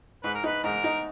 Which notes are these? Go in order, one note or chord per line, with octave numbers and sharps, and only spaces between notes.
G#2 B4
A#4
D#4 B4
G#2 A#4
D#4